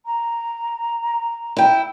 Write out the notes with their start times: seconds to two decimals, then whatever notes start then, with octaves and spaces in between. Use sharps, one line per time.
0.06 A#5
1.57 E4 G5